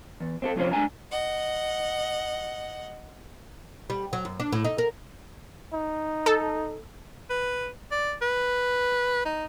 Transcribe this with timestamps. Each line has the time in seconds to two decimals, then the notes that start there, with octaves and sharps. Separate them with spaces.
0.20 E2
0.42 C4 F4 A4
0.56 F2 C3 F3 C#4 F4 C5
0.71 G#3 D4 G#5 A#5
1.09 D#5 F#5
3.90 G3
4.13 F#3
4.25 F#2
4.40 D4
4.52 A2
4.65 D#4
4.78 A#4
5.73 D#4
6.26 A4
7.30 B4
7.92 D5
8.22 B4
9.25 D#4